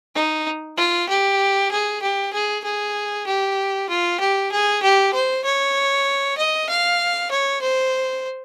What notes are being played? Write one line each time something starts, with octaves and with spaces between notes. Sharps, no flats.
D#4
F4
G4
G#4
G4
G#4
G#4
G4
F4
G4
G#4
G4
C5
C#5
D#5
F5
C#5
C5